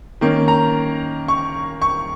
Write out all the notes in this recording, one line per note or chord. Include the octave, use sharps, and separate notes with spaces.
D#3 A#3 C#4
A#5
C#6
C#6